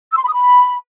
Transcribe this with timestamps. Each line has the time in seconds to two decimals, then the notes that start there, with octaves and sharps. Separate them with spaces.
0.12 E6
0.17 C6
0.22 B5
0.28 D#6
0.33 B5